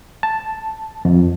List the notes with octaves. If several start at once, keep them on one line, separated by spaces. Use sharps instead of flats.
A5
F2